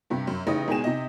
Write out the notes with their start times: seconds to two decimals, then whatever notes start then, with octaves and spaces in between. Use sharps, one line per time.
0.10 G2 C3
0.27 F#2
0.47 A1 C#3 D#4 D#6 A#6
0.68 G#1 B2 G#3 G5 G#5 E7
0.84 C3 D#5